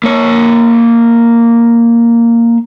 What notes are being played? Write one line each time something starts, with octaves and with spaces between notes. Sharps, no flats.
A#3 C#5